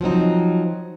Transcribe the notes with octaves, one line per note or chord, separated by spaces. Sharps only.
F3 F#3 C4 D#4